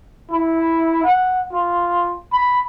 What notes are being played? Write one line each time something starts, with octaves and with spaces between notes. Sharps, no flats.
E4
F#5
F4
B5